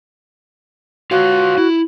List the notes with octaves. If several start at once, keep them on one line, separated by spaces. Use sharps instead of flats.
F4 F#4 C#5 F5
E4